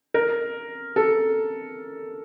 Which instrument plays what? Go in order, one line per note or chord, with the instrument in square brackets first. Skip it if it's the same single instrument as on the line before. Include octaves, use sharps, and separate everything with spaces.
[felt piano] A#4
A4